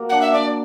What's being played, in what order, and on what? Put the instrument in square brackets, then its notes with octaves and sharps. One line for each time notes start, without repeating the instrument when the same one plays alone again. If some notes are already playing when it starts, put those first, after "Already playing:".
Already playing: [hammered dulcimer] A#3 F#4
[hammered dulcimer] D4 [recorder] F#5
[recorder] E5
[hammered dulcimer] D4 [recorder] D5